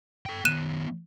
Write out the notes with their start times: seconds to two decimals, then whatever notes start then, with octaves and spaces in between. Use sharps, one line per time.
0.26 A4 G5
0.45 D#3 B3 F#6 D#7 E7